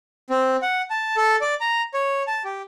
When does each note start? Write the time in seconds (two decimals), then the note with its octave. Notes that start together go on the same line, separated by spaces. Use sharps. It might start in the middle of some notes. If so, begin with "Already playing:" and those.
0.30 C4
0.62 F#5
0.90 A5
1.17 A4
1.41 D5
1.61 A#5
1.94 C#5
2.27 A5
2.45 G4